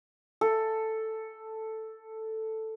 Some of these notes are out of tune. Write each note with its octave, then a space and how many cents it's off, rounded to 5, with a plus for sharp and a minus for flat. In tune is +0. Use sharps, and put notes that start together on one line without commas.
A4 +5